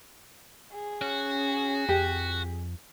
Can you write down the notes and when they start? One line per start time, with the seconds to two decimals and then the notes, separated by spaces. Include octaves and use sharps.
0.73 G#4
1.01 C#4 F#4
1.89 F2 G4